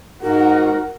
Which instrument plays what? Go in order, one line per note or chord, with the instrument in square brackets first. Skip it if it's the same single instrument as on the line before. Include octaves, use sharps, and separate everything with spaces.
[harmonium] G#2 [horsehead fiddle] F#4 [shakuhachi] A#4